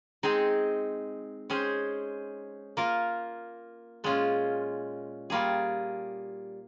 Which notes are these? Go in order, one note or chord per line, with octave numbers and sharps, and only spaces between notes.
G#3 C4 D#4 G#4
G#3 C#4 G#4 C5
A#3 F4 A#4
A#2 G#3 C#4 F4
G3 A#3 F4 G#4